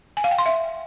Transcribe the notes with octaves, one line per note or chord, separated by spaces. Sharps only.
G#5
F5
G5
C6
E5